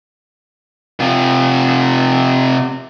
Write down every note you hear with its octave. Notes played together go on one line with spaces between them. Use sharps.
C3 F4